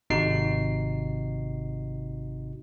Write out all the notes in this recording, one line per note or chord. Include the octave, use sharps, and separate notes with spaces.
G#1 C3 D#4 F#4 C7